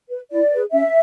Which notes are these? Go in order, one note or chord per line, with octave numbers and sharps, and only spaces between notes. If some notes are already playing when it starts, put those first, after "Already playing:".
B4
E4 D5
G#4 B4
C#4 E5